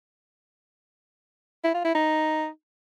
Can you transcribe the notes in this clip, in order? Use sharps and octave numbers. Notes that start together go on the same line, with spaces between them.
E4
F4
E4
D#4